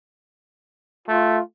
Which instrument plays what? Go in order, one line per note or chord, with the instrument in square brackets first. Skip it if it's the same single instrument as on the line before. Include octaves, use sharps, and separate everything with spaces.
[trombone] A3 [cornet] F4